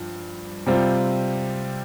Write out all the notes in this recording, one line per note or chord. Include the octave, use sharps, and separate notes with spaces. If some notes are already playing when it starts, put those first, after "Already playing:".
Already playing: G2 F3
C3 G3 C4 F4